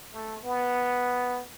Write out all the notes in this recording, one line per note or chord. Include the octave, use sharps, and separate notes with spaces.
A3
B3